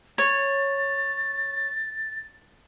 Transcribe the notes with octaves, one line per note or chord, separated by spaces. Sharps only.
C#5 A6